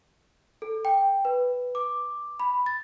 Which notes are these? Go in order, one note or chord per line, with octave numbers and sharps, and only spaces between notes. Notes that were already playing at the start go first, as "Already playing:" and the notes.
A4
G5
B4
D6
B5
A6